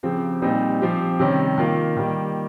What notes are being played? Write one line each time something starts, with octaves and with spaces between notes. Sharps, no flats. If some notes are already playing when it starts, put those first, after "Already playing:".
C#3 F3 C4 G4
A#2 G3 C4 D#4
F3 C4 G4
C3 D#3 G3 C#4
D#3 A#3 F4
D#3 G3 A#3